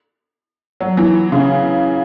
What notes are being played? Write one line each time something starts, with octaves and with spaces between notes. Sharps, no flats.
F#3
E3
C#3